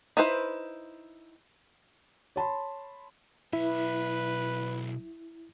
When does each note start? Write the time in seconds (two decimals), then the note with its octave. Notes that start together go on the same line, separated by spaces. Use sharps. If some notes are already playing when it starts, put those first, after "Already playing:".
0.17 D#4 E4 B4 C5
2.36 C#5 A5 B5 C6
3.53 B1 E4 B4 E5